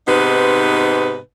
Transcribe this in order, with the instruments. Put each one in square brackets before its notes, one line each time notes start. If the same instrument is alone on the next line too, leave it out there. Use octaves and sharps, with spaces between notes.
[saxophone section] G#2 C3 B3 D#4 B4